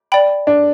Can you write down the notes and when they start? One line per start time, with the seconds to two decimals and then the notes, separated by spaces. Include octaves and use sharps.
0.12 D5 G5 B5
0.47 D4